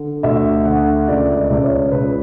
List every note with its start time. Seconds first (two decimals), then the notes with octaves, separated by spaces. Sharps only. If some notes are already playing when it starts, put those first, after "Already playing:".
Already playing: D3
0.23 D2 E5
0.65 D3 F#5
1.08 C#2 D5
1.36 D5
1.44 E5
1.50 C#2 D5
1.64 C#5
1.92 C#2 B4